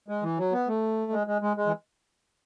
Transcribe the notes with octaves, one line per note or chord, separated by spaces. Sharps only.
G#3
E3
F#3
B3
A3
G#3
G#3
G#3
G#3
E3